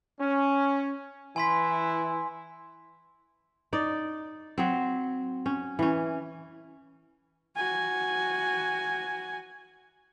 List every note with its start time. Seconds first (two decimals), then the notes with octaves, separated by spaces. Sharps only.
0.20 C#4
1.36 E3 E4 G#5 C6 B6
3.73 D#4 D5
4.58 F#3 C4
5.46 C#4
5.79 E3 C#4
7.57 F#4 G#5